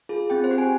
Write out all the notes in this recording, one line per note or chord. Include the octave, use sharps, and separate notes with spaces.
F4 G#4
C4 G5
C5
G4
G#5